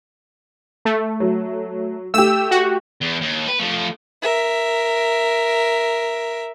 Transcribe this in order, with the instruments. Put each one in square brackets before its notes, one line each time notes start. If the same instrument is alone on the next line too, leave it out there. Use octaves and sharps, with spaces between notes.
[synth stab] A3
[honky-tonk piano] F#3
[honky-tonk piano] A3 G4 [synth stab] E6
[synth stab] F#4
[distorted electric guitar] E2
D#2
B4
F3 A3
[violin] A#4 E5